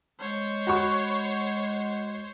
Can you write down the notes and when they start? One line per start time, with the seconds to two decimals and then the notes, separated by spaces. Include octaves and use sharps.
0.20 G#3 C5 C#5
0.67 F#4 B5 C#6